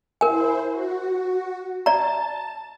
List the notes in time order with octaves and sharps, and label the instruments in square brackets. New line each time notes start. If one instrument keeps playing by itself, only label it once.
[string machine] E4 C5 [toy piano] A#4 G#5
[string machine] F#4
[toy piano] D5 A#5 [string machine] A5